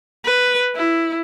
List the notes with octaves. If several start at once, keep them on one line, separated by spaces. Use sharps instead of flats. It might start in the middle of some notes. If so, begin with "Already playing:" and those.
B4
E4